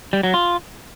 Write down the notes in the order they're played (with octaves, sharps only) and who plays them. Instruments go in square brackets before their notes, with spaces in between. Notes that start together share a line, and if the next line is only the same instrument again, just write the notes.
[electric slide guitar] G3
F#3
F4